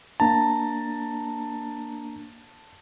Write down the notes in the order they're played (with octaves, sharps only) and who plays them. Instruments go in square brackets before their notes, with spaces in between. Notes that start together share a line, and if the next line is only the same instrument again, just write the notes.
[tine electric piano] A#3 D4 A#5 [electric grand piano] A5